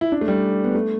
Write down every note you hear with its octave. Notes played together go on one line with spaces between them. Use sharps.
E4
D4
A3
G3
B3
A3